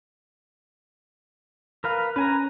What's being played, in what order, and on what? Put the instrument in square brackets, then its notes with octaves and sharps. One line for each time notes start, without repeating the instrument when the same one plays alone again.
[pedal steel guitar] A#4 B4 F5
[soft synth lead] C#4 [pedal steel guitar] B4 G#5 A#5